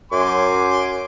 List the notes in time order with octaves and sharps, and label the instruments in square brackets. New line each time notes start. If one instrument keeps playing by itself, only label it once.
[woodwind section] F#2 [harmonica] G#5 C6 D6